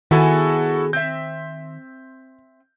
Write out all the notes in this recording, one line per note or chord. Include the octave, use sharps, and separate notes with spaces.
D#3 B3 E4 F#4 G#4 A4 A5
C4 E5 G6